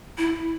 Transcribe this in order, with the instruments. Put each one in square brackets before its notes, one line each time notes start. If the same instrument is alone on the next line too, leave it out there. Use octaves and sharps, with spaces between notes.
[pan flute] E4